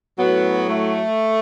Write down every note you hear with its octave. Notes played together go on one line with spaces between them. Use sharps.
A2 F#3 B3
A3